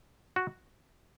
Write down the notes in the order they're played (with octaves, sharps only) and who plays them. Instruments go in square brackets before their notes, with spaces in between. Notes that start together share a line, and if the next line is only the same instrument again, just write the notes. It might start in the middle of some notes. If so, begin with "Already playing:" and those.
[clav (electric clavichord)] F#4